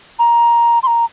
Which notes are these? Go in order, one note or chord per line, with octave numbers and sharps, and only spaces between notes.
A#5
C6
A#5